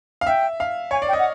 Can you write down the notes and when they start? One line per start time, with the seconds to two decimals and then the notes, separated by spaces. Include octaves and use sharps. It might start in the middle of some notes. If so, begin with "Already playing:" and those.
0.21 F5
0.27 E5 G5
0.60 F5
0.91 C#5 G#5
1.02 D5
1.09 G5
1.13 D#5
1.19 F#5